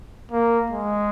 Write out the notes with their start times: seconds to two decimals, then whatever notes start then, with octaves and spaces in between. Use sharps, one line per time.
0.32 A#3
0.70 G#3